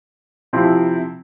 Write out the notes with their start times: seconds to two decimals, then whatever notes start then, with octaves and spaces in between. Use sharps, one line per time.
0.53 C3 F3 C4 E4